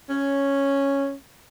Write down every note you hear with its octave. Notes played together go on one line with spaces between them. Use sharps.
C#4